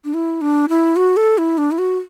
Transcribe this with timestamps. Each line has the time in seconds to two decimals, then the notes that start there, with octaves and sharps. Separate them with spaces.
0.05 D4
0.14 E4
0.41 D4
0.69 E4
0.96 F#4
1.17 A4
1.38 E4
1.58 D4
1.71 E4
1.78 F#4